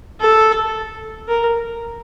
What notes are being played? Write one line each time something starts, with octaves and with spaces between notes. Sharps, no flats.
A4
A#4